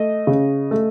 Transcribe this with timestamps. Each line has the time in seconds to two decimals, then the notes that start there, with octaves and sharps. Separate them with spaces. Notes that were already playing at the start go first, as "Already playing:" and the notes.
Already playing: A3 D#5
0.27 C#3
0.71 A3